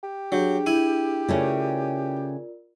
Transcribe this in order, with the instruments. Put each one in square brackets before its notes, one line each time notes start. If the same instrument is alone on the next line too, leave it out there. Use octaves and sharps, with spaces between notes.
[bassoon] G4
[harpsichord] F#3 [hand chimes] D4 G#4 G6
[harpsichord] E4 G#5
[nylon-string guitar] C#3 A3 C#4 [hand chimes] F4 A#4 D5